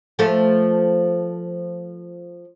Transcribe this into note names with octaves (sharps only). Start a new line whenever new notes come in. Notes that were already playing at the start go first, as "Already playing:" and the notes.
F3 A3